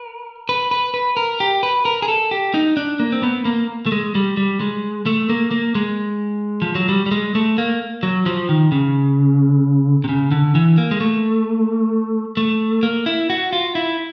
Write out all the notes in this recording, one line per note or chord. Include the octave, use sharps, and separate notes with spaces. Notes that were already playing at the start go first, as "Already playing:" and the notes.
Already playing: A#4
B4
B4
B4
A#4
G4
B4
A#4
G#4
A4
G4
D#4
D4
A#3
C4
B3
A#3
A3
G#3
G3
G3
G#3
A3
A#3
A#3
G#3
F3
F#3
G3
G3
G#3
A3
A#3
F#3
F3
D#3
C#3
C3
C#3
D3
E3
A#3
G#3
A3
A3
A#3
E4
F#4
F4
E4